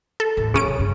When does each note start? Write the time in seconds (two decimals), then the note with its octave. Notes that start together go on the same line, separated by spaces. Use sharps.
0.20 A4
0.37 D#2 A2
0.54 C#3 F#3 C#4 D7
0.68 C2
0.79 G2